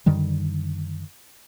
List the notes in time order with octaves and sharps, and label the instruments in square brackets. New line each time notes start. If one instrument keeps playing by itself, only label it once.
[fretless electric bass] F#2 D3 D#3 G3